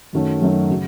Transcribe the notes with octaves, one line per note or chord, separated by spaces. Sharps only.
F#2 D#3 F#3 A3 C#4
F#2 D#3 F#3 A3 C#4
C#3 F#3